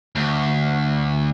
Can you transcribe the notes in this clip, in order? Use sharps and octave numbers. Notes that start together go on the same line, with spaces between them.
D2